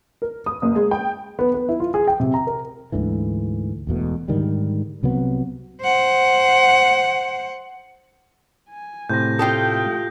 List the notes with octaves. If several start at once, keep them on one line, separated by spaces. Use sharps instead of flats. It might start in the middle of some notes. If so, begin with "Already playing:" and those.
A#4
D#6
F#1
G#3
G5
B3
B3
E4
F4
G#4
G5
C3
A#5
A#4
D2 G#2 D3 E3
E1 E2 B2 A3
G#2 D3 D#3 G3
C2 C3 F#3 B3
C5 F#5
G#5
A2 C3 G6 A#6
A3 F4 G4 A4 G5 D#6